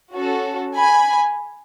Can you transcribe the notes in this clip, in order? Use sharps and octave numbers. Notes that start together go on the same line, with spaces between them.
C#4 F#4 A4
G#5 B5